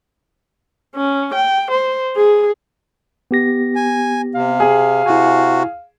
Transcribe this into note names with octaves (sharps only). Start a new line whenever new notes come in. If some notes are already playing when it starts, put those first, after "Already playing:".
C#4
G5
C5
G#4
B3 G4 A#6
G#5
C3 F5
G#4
C3 E4 F#4 G#5